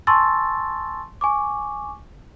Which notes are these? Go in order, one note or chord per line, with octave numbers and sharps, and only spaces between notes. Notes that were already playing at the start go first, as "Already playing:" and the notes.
G#5 A5 C6 C#6 E6 A6
G#5 C#6 D6